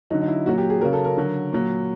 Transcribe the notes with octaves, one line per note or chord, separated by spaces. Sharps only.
D3 F#3 D#4
D#4
E4
A#2 F#3 F#4
G4
G#4
C#3 F#3 A#4
A4
A#4
D3 F#3
A#2 F#3